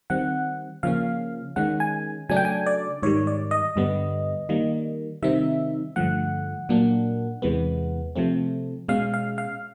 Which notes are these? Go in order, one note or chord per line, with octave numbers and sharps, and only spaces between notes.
D#3 G3 C4 F#5
C#3 F3 A#3 C#4 F5
D#3 G#3 C#4 F#5
G#5
C#3 F#3 A3 D4 G#5
G5
G#5
D5
G#2 D#3 G3 C#5
D5
D#5
G2 D3 G3 B3
D#3 G3 A#3
C3 D#3 G3 C4 D#4 E5
G2 D3 F3 A3 F#5
A#2 F#3 A#3 D4
E2 C3 E3 G#3 B3
C3 F3 A3 C4
B2 G#3 C#4 F5
F5
F5